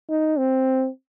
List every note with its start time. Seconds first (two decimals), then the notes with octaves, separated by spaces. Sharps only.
0.10 D#4
0.38 C4